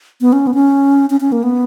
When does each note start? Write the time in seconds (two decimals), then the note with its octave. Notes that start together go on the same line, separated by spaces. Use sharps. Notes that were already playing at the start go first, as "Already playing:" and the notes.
0.21 B3
0.33 C#4
0.47 B3
0.54 C#4
1.10 C#4
1.21 C#4
1.32 A#3
1.43 B3